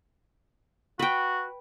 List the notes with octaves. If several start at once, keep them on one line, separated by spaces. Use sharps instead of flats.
F#4 B4 G5